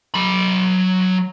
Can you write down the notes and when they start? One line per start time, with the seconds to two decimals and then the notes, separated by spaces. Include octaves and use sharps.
0.14 F#3 B5